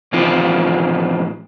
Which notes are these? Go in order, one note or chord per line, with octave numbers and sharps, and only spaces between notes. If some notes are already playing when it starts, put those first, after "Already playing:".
A2 E3 F3 C4 D#4 F4